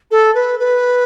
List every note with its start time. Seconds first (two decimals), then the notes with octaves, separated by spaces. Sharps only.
0.11 A4
0.34 B4
0.59 B4